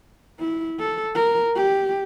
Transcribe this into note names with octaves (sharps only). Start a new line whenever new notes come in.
E4
A4
A#4
G4